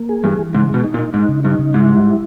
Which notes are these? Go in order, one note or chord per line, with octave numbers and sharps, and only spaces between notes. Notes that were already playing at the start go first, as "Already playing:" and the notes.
Already playing: A#3
G#4
G2 E3
E3
G#2 C#3
B2 G#3
D#4
A#2
D#4
G#2 D#4
C#3
G2 D#4
C#3
G#2 E4
G3
E4